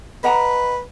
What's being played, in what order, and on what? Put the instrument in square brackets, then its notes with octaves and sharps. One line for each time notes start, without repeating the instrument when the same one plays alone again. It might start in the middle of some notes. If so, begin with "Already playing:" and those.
[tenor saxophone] B4 [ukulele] D#5 F#5 A#5